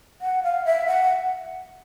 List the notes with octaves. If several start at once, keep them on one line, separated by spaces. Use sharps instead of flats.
F#5
F5
E5
F#5